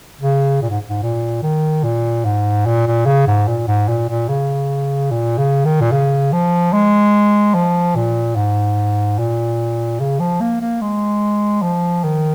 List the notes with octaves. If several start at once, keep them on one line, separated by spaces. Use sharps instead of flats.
C#3
A#2
G#2
G#2
A#2
D#3
A#2
G#2
A#2
A#2
C#3
G#2
A#2
G#2
A#2
A#2
C#3
A#2
C#3
D#3
A#2
C#3
F3
G#3
F3
A#2
G#2
A#2
C#3
F3
A#3
A#3
G#3
F3
D#3